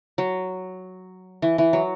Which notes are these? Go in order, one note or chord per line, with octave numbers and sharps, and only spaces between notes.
F#3
E3
E3
F#3